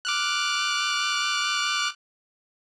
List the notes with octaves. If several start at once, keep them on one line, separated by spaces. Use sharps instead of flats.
D6 F6 F#6